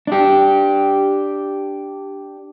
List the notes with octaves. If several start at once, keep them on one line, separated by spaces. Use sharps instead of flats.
D4 G4